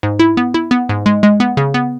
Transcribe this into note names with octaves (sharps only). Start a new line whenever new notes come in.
G#2
E4
B3
E4
B3
G#2
G#3
G#3
B3
C#3
B3